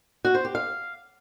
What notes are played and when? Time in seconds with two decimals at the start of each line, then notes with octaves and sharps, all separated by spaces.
0.25 F#4
0.35 C5
0.45 G4
0.55 F5